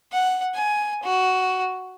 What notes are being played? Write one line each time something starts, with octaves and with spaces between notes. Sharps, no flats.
F#5
G#5
F#4